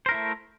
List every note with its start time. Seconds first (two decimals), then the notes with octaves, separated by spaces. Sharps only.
0.06 C5
0.09 A#4
0.11 E4
0.14 A3